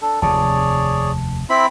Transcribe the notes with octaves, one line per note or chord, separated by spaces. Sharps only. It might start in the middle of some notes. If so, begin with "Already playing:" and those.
D4 A4
F1 D#2 C3 G#4 C#5 D5 A5
C4 E4 B5